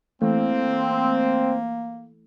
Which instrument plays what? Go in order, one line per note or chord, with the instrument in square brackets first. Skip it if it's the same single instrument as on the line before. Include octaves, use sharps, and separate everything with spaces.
[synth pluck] E3 A3 [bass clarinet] A#3 [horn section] C4